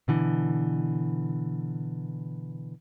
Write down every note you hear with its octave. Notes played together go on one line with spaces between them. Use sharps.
B2 D3 E3